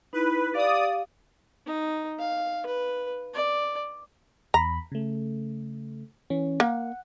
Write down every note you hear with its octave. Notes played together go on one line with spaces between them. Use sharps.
D#4 E4 B4
G4 D5 F5 D#6
D#4
F5
B4
D5
E2 A#5 B5
C#3 A3
E3 C#4
A#3 F#5